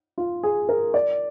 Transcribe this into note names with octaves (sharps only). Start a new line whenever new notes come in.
F4
G#4
A#4
D5